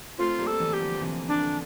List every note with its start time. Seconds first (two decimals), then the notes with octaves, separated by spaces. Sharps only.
0.18 A3 C4 F4
0.39 G3 A#3
0.47 A4
0.60 E3 G3
0.73 G4
0.80 D3 F3
0.93 F3
1.01 C3 E3
1.28 D4
1.42 D3